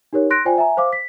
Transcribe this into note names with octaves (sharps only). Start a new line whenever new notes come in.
D#4 G4 A#4 C#5
C6 F#6 A#6 D7
F4 C5 D5 G5 G#5
E5 G#5 A#5
C5 F5 D6
B6